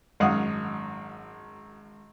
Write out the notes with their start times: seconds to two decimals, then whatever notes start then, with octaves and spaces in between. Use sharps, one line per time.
0.20 G#1 F#2 F5 F#5 D#6